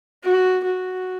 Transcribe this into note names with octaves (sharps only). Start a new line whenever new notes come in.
F#4
F#4